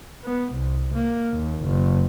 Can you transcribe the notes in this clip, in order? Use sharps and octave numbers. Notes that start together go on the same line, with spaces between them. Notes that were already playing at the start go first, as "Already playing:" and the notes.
B3
C2
A#3
D#2
F#1